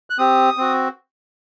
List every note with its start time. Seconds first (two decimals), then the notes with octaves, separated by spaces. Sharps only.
0.10 F#6
0.18 C4 G4 D#6
0.57 C4 F#4